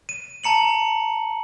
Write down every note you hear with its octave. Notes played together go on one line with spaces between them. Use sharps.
D#7
A5 A#5 C#7 F#7